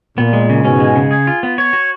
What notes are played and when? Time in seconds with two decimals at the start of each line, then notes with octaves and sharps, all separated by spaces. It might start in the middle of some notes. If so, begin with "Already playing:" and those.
0.17 A#2 B3
0.33 G#3
0.49 C#3
0.65 G#2 B2 C#4
0.80 G#3
0.96 C#3
1.11 G#4
1.27 F4
1.43 B3
1.58 C#5
1.73 F#4